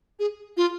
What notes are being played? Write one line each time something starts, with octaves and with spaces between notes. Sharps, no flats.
G#4
F4